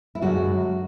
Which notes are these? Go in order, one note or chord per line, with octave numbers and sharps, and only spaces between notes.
E4
F#2 D3 G#3 F#4